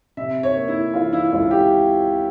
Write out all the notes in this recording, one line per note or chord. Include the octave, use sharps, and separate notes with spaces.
C3 E5
C#5
A#3
E4
E3 F4
E4
C#2 F4
G4